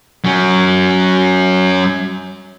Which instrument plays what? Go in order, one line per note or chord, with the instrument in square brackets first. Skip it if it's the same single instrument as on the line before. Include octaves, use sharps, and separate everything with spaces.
[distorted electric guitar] F#3 C#4